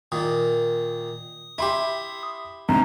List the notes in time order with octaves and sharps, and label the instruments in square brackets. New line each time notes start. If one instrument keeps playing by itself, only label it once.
[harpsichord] A#2 D#3 [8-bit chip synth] D#6
[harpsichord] E4 G4 [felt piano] E5 B5 C6
[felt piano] D2 G#2 C3 [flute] A#5